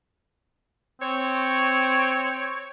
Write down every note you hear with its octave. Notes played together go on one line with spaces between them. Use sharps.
C4 C#5